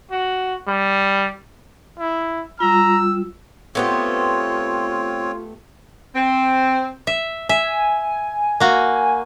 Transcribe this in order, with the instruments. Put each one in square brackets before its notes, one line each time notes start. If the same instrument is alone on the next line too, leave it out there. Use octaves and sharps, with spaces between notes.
[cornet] F#4
G3
E4
[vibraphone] G3 F4 [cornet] A#5 [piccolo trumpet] E6
[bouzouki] A3 B3 G4 [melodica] C4 C#5 [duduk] F4
[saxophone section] C4
[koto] E5
[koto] E5 [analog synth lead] G#5
[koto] A#3 F#4